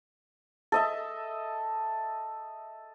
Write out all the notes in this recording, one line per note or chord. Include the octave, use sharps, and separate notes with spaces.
A4 D#5 E5